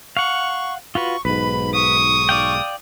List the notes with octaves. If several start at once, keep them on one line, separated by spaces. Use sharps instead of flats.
F5 F#5 C#6
F4 F#4 B4 C#6
B1 G#2 B4 B5
C#6 D#6
D5 F5 G5